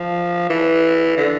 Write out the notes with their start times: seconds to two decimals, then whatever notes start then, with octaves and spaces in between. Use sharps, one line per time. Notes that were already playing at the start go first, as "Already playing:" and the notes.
Already playing: F3
0.50 E3
1.17 D3